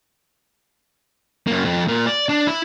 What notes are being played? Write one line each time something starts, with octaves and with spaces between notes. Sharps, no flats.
F#2 A#3
F2
A#2 A#4
D5
D4
E4